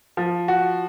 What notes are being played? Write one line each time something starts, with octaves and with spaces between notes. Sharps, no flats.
F3
F#4